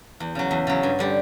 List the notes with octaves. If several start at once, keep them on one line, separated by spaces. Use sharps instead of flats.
E2
C#3 F#3
E2
C#3 F#3
G2
D3 G3